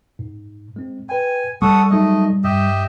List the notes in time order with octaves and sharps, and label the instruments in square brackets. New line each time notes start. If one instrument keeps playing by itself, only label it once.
[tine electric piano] G#2
G#3 C4
[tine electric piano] B4 G5 [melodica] G#5
[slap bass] G3 [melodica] A4 F#5 D#6 [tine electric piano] C#6 E6
[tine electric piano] F#3 G#3 D#4 [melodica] A3 D#5
[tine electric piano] G2 [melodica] G4 D#5 E5